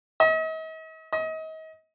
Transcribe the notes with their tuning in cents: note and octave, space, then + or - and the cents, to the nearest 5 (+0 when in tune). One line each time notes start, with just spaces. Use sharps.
D#5 +45
D#5 +35